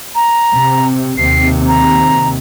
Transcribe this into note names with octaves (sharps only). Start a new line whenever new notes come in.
A#5
C3
D#2 C3 C7
A#5